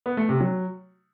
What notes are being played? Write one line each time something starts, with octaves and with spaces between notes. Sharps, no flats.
B3
A3
C3
F#3